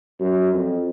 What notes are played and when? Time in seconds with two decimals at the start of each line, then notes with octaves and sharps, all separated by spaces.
0.20 F#2
0.53 F2